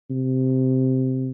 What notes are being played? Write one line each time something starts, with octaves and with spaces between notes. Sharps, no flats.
C3